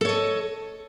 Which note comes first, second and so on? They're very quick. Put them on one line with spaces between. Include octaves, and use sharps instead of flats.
A4 C#5 D#5